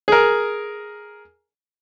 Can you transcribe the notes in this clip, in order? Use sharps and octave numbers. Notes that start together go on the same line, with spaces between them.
G#4 A#4